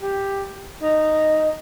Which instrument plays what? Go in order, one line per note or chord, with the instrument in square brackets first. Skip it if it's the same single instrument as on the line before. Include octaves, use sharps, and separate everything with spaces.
[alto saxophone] G4
D#4